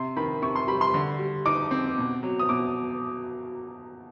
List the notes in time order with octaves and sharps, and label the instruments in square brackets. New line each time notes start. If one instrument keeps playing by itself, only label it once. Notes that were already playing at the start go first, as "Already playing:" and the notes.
Already playing: [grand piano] C3 [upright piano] C6
[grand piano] D#3 [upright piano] B5
[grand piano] C3 [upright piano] C#6
[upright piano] C6
[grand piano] G3 [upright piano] B5
[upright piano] C6
[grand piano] D3
G3
[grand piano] D#4 [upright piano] D6
[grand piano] C4
B2
F#3
[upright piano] D#6
[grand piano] B2 [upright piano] D6